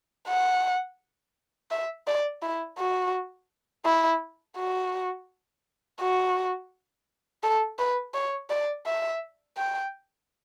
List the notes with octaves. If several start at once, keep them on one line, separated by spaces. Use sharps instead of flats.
F#5
E5
D5
E4
F#4
E4
F#4
F#4
A4
B4
C#5
D5
E5
G5